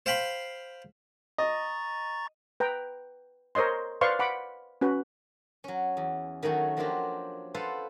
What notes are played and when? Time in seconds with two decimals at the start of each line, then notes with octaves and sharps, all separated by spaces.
0.06 C5 F5 G5 B5 C6
1.38 D#5 A#5 C#6 A6
2.60 B4 G5 A#5
3.55 A#4 C5 C#5 D#5 C6
4.01 B4 C5 D5 F5 C6 C#6
4.19 F#5 B5 D6
4.81 C#4 F#4 B4
5.64 F#3 C#4
5.97 E2
6.43 D#3 F#3 A3 C#4
6.77 F3 F#3 A#3 D4 F4 G4
7.55 F4 A4 B4 C5 F5 F#5